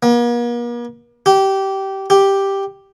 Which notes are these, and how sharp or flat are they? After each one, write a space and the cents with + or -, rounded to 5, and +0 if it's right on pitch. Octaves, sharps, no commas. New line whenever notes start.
A#3 +45
G4 -20
G4 +0